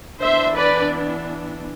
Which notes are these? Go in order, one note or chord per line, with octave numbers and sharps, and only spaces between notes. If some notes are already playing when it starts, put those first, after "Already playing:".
E3 B3 D4 C5 E5
B4 D5